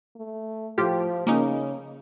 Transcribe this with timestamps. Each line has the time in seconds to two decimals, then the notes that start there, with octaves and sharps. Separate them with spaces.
0.16 A3
0.78 A2 F3 F4 G4
1.27 C#3 A#3 C#4 D#4